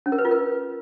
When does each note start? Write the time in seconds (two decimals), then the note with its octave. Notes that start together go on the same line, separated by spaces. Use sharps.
0.06 C#4
0.12 A#4
0.18 B4
0.25 F4
0.31 A#4